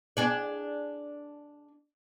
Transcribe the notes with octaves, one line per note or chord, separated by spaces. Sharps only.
D4 G#4 D5